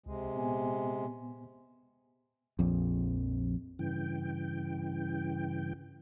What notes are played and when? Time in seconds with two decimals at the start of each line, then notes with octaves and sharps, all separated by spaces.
0.06 C#2 C3 G#3
0.36 A#2 B3 G#5
2.59 A#1 F2
3.79 G2 C#3 E3 G5